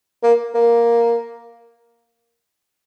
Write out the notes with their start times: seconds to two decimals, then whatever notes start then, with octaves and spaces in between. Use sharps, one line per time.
0.23 A#3
0.55 A#3